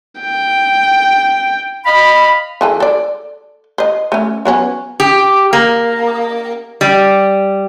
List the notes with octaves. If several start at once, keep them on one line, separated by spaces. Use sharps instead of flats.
G5
D#5 F5 B5
E3 G#4 A4
A4 D5
C5 D#5
A3 C#4
F#3 B3 C#4
G4
A#3
G3